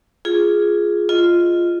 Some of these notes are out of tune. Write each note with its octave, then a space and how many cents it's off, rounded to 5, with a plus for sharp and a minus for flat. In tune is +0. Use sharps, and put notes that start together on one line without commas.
F4 +0 G#4 +0
F4 -5 D#5 +0